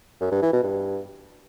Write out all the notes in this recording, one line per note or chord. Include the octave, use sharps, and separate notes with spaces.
F#2
G2
E3
B2
G2